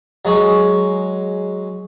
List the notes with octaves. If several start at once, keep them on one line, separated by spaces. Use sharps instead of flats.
F#3 G#3 G#4 C#5